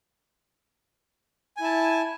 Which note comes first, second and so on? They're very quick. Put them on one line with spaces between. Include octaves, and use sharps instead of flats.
G#5 E4 A5